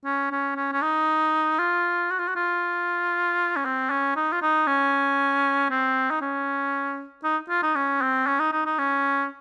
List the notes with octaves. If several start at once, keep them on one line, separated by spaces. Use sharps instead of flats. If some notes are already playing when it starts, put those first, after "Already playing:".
C#4
C#4
C#4
C#4
D#4
F4
F#4
F4
F#4
F4
C#4
C4
C#4
D#4
F4
D#4
C#4
C4
D#4
C#4
D#4
F4
D#4
C#4
C4
C#4
D#4
D#4
D#4
C#4